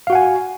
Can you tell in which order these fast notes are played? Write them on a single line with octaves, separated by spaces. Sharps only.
F5 F#4 F#5 G#5